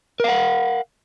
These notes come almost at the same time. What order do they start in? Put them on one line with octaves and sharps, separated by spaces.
A#4 F5 F#5